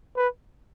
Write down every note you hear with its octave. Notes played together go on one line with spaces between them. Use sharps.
B4